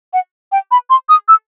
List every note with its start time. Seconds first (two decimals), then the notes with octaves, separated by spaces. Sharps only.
0.13 F#5
0.52 G5
0.71 B5
0.90 C6
1.09 D#6
1.28 E6